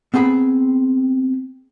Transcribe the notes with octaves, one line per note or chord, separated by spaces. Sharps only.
B3 C4 G#4 A5 B5